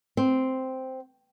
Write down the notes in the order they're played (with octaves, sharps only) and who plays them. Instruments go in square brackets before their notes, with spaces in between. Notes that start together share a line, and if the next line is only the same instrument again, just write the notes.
[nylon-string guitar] C4